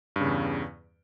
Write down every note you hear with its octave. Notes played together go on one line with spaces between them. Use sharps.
E2 G2 C#3